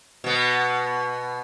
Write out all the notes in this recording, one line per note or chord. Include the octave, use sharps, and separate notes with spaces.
B2 B3